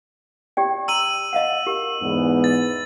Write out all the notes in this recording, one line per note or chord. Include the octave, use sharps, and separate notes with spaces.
G4 D5 G5
A#5 E6 D#7 F#7
D#5 F5 F#5
G4 A#4
E2 G#2 B3
A6